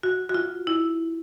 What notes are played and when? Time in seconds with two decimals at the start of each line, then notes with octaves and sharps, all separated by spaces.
0.03 F#4
0.29 F#4
0.34 F4
0.67 E4